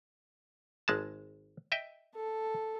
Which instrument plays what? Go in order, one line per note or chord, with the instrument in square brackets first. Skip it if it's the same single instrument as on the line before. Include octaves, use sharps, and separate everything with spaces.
[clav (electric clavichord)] G#1 G#3 A5
D#5 E5 G5
[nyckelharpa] A4